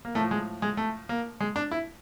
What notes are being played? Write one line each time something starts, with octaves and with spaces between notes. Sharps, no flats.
A#3
A2 F3 A3
G#3
G#3
A3
A#3
G#3
D4
E4